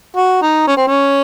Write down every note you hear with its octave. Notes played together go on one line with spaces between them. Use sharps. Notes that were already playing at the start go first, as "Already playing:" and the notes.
F#4
D#4
C#4
C4
C#4